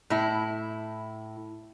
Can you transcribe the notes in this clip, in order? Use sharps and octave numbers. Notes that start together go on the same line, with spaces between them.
A2 E4